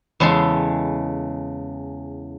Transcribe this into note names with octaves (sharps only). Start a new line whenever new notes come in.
E2 C#3 G#3 A4 C6